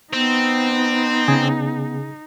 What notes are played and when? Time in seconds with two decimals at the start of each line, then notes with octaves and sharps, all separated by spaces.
0.13 B3 C4 D#4
1.28 C#3 G#4